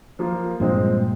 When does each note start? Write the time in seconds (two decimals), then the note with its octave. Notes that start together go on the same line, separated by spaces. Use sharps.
0.19 F3 A#3 F4 A#4
0.60 G2 A#2 F3 G#3 C4